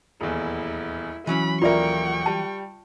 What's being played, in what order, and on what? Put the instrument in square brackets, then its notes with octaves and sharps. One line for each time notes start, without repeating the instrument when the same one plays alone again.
[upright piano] D#1 E2 [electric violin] E4
[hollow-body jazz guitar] E3 F#3 C#4 [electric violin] B5
[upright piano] D#1 A#4 [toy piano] F4 D5 E5 [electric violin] G5 C#6
[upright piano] G3 [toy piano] A5